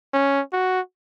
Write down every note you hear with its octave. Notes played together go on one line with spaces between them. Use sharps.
C#4
F#4